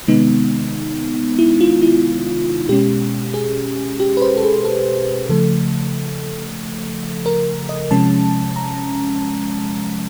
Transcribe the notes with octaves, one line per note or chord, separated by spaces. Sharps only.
C3 D#3 G#3 B3 D#4
E4
F4
E4
B2 G#3 C#4 G4
G#4
G4
B4
C5
A4
G#4
A4
C#3 F3 A3 A4
A#4
D#5
C3 F3 G#3 C#4 A5
A#5